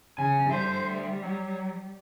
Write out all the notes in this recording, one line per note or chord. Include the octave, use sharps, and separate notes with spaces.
C#3 G#5
D3 G3 C5 E5
G3
F#3